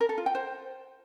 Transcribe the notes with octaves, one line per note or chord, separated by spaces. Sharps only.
A#4
A4
F4
G5
C5